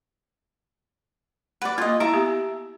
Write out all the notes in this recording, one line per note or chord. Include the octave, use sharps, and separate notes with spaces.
B4 D5 F#5
A#3 F4 D#5
E4 E5 F5 A5 A#5
B3 G4